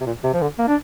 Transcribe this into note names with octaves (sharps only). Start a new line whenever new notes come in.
C3
A#2
C3
F3
D3
A#3
D4